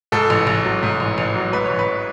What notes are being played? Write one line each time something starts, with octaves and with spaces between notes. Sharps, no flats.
G#2 A4
A1
A1
F#3
G#2
A1
A1
F#3
G#2 B4
A1 C#5
B4